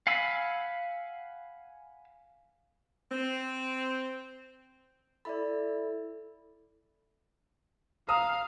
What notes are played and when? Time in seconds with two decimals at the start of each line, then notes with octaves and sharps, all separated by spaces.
0.07 F5 F#5 G#5 B5 E6
3.11 C4
5.25 E4 A4 D5 E5 B5
8.09 F5 A#5 D#6 E6